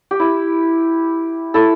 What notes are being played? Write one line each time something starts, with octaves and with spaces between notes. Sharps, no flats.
G4
E4
E4 A4